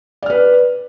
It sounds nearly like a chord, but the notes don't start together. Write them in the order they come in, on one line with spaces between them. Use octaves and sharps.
D5 F6 B4